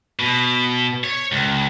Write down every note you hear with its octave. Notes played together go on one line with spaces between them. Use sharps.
B2
C#5
C#2